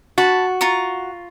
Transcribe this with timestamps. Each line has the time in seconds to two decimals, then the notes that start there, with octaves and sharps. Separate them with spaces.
0.18 F#4 A5 B5
0.61 F4 A#5 C#6